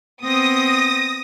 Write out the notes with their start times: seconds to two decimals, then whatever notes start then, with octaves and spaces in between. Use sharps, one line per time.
0.24 B3 C4 D#6 A#6